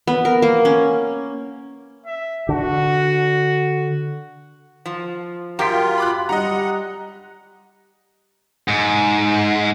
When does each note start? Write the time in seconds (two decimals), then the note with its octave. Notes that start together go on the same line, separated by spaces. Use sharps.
0.07 B3
0.25 A#4
0.42 A#3
0.65 C#4
2.06 E5
2.49 D3 F#4
4.86 F3
5.59 F#2 F4 G4 A#4 G5 C6 B6
5.98 B5 D6 F#6
6.29 G3 D#5 F#5 A#5
8.68 G#2